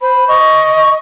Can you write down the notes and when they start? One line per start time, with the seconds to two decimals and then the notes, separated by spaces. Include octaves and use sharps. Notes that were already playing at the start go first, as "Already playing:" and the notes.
0.01 C5 B5
0.28 D#5 C#6